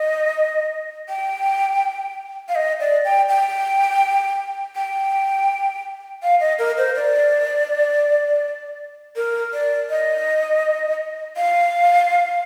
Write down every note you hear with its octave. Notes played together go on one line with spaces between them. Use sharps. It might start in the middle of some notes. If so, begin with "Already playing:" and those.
Already playing: D#5
G5
F5
D#5
D5
G5
G5
G5
F5
D#5
A#4
C5
D5
A#4
D5
D#5
F5